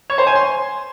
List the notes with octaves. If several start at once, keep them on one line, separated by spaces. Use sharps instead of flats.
C#5
C5
G#5
C6